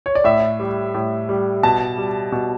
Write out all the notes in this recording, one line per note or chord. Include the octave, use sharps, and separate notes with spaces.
C#5
D5
A2 E5
G3
A2
G3
B2 A5
G3
B2